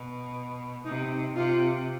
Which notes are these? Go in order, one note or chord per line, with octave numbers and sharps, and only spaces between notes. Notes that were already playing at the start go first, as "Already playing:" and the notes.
Already playing: B2
C3 D#4
C3 F4